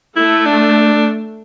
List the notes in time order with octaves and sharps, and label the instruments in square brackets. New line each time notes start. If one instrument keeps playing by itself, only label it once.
[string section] A3 [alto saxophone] E4
[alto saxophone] D4